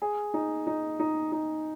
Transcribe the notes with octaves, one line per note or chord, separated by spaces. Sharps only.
G#4
D#4
D#4
D#4
D#4